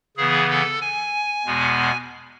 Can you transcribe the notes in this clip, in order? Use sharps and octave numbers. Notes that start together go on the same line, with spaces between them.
C#3 E3 B3 G#4
A4
G#5
E2 B2 G#3 B3